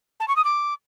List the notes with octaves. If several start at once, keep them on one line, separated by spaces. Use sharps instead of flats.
A5
C#6
D#6
D6